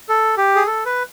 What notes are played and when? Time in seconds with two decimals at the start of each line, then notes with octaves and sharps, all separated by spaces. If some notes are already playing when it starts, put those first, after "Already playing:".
0.09 A4
0.37 G4
0.56 G#4
0.67 A4
0.86 B4